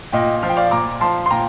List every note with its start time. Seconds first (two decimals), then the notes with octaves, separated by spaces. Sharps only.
0.13 A#2 D#5 G5
0.43 F3 F5
0.49 G5
0.56 D5 F5
0.71 A#2 A#5 D6
1.01 F3 A5 C6
1.26 C6
1.31 A#2 G5 A#5